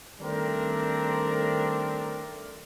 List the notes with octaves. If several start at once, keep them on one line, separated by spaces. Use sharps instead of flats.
D#3 G3 A3 C4 D4 A#4